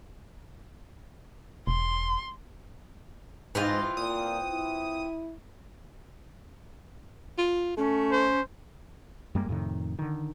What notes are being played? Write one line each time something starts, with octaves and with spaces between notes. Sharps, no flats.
E1 C6
G#2 E3 C4 F4 D#5 A6
A#2 D#6
E4
F4
A3 C#4
C5
F#2 G3 G#3 A#3
F2 A2 C3 D#3
D3 D#3